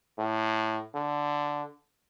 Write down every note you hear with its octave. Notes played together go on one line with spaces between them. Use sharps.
A2
D3